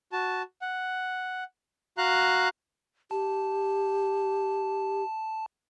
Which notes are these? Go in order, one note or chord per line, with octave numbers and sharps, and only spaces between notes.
F#4 A5
F#5
F#4 F5 A#5 F#6
G4 A5